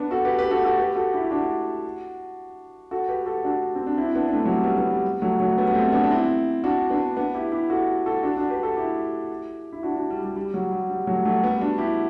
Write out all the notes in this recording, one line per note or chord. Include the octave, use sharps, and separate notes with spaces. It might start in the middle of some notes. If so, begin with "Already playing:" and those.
Already playing: B3 D4
F#4 A4
G4 B4
G4 B4
F#4 A4
F#4 A4
G4 B4
F#4 A4
E4 G4
G4
D4 F#4
F#4 A4
G4 B4
F#4 A4
D4 F#4
C4
D4
C4 E4
B3 D4
D4
A3 C4
F#3
G3
G3 B3
G3 B3
G3
F#3 A3
F#3 A3
G3 B3
B3
A3 C4
B3 D4
D4
C4 E4
D4 F#4
B3 D4
B3 D4
E4 G4
E4 G4
F#4 A4
F#4 A4
D4 F#4
D4 F#4
G4 B4
F#4 A4
E4 G4
E4
D4 F#4
D4 F#4
G3
G3
G3
F#3
G3
G3
F#3 A3
F#3 A3
G3 B3
D4 F#4
E4 G4